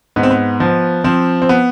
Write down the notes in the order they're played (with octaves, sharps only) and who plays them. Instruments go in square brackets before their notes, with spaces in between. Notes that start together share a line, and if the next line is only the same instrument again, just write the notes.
[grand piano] G#2 B3
C4
B3
F3
F3 C4
C4
B3